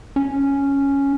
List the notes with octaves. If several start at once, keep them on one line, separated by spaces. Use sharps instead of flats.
C#4